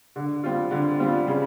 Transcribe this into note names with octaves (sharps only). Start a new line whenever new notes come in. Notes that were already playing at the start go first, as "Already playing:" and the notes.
D3
G3 C4 F4
D3
G3 C4 F4
C#3